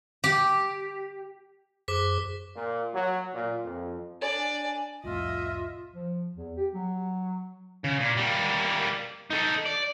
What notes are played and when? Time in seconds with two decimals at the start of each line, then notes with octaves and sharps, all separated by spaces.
0.24 G4
1.88 F#2 G#4 C5 D6 B6
2.55 A#2
2.94 F#3
3.33 A#2
3.65 F2
4.21 D4 D5 G#5
5.04 C2 F2 A2 F4 D#5 E5
5.95 F3
6.36 E2
6.57 G4
6.74 F#3
7.84 C#3
8.00 A#2
8.17 G3 A#3
9.30 D#4 A4
9.66 D5